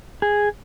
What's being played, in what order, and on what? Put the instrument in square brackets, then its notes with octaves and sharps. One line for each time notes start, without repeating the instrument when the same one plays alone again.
[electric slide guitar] G#4